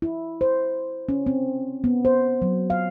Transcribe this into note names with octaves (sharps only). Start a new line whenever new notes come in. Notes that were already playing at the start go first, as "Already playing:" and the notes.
E4
C5
C#4
C4
B3
C5
F#3
F5